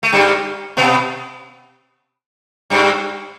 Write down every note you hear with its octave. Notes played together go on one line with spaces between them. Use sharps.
A3
G2 G3
B2 B3
G2 G3